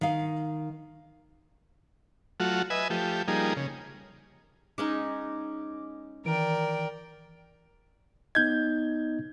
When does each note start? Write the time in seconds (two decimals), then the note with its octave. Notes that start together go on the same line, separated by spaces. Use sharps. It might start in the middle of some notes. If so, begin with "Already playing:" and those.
0.01 D#3 F5
2.40 F#3 A3 F4 F#4
2.70 B4 D#5 E5 G#5
2.90 F3 A3 G4
3.28 F3 G3 A#3 D#4 G#4
3.57 C#3
4.78 G#3 C#4 D#4 D6
6.25 D#3 E3 A#4 D5 G5 D7
8.35 B3 D#4 D#5 G6 G#6